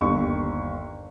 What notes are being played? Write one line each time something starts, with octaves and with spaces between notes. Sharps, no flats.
G1 D#2 C#6